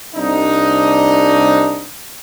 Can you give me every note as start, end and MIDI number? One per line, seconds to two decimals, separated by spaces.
0.15 1.88 36
0.15 1.88 62
0.15 1.88 63